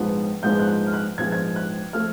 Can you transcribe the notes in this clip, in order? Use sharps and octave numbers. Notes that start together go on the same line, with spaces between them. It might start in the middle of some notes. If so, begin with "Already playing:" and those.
Already playing: A#1 G#2 F3 G#3 B3
A#1 G#2 F3 G#3 B3 G6
F#6
G6
F6
F#6
A#1 G#2 F3 G#3 B3 G#6
G#6
F#6
F3 A3 F6